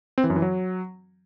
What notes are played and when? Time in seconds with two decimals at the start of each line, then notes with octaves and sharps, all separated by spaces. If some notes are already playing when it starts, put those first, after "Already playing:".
0.18 C4
0.24 E3
0.30 F#2
0.36 E3
0.42 F#3